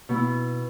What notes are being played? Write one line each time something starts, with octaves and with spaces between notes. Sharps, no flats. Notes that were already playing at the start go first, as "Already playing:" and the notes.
B2 B3 E4